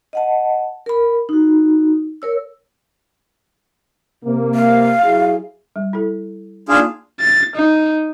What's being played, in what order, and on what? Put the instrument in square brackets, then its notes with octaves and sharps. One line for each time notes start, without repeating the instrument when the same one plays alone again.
[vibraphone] D#5 F#5 A5
A#4 B5
D#4 F#4
A#4 C#5 E6
[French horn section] C3 A#3
[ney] F5
[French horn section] F#3 E4 G#4
[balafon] G3
E4 A4
[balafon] A#3 D#4 F5 [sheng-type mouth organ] D4 F4 G#4
[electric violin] A6
D#4